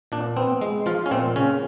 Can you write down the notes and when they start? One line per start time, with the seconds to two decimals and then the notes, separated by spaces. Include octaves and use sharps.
0.12 A#2 D4
0.37 B3 C4
0.61 G#3
0.86 F3 F4
1.06 C#4
1.11 A#2 C4
1.36 C#3 C#4